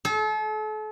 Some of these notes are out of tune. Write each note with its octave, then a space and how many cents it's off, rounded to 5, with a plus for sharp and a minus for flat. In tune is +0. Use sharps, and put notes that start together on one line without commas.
A4 -40